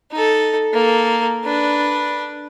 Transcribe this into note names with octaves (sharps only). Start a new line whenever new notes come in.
D#4 A4
A#3 A4
D4 B4